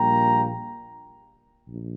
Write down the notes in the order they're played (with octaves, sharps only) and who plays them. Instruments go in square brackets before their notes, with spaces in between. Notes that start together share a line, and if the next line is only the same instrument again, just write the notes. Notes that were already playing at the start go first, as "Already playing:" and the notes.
Already playing: [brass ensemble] A#1 A#2 G3 A#3 G5 A#5
A#1